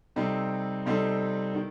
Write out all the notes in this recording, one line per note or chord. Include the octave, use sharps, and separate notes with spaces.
C3 G3 C4 D#4 A4
C3 G3 C4 D#4 A4
D#3